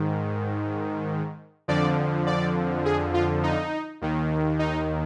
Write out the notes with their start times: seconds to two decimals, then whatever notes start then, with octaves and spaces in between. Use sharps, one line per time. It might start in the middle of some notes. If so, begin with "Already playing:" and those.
Already playing: G#2 D#3
1.68 F2 D3 F3 D5
2.27 D5
2.85 G#4
3.14 F4
3.43 D#4
4.01 D#2 D#3
4.59 D#4